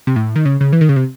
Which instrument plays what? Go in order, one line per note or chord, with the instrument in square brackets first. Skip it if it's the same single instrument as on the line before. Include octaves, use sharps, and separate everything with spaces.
[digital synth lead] C3
A2
D#3
C#3
C#3
E3
D#3
C#3
C3